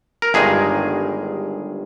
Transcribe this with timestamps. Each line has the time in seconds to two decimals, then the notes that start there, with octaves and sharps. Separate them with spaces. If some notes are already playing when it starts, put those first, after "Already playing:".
0.22 A#4
0.34 G1 G2 D#3 G#3 G#4